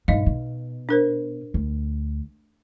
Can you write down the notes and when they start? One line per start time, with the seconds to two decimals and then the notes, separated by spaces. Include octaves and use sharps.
0.08 G2 B2 D#4 D#5 F5
0.26 B2
0.89 D4 A#4 C5
1.54 D2